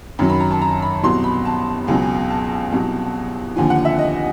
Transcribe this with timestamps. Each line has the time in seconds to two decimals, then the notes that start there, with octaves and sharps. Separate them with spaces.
0.19 F#2 D#3 F#3
0.30 B5
0.40 A#5
0.51 A5
0.61 A#5
0.82 B5
1.03 C2 B2 F#3 C6
1.24 B5
1.45 A5
1.87 C#2 B2 F#3 G#5
2.02 G#5
2.30 A5
2.72 C2 B2 F#3
3.56 D#2 D3 F3 G#5
3.70 F#5
3.85 E5
3.98 D#5